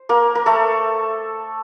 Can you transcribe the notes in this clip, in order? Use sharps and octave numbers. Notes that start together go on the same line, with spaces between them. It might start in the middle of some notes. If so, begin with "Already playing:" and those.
Already playing: C5
A#3 A#4
A#4
A3 A4